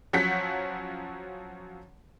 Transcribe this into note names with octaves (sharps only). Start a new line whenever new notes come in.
F3 F#3 C#4 F#5 G6 B6